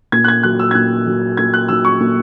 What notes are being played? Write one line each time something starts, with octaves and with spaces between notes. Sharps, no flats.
A#2 G#6
F#6
G#6
F#3 F#6
E6
G#6
A#2 F#6
F#3
A#2 G#6
F#6
F#3 E6
C#6
A#2